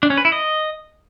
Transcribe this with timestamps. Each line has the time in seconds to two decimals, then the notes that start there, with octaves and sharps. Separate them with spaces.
0.03 D4
0.10 C#4
0.18 B4
0.25 E4
0.32 D#5